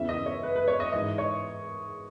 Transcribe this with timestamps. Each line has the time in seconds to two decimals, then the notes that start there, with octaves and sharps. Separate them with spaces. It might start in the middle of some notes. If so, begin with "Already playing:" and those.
Already playing: E2 C#3 E3 E5
0.09 D#5
0.26 C#5
0.43 B4
0.56 B4
0.68 C#5
0.80 D#5
0.93 G#2 E3 D#5
1.18 C#5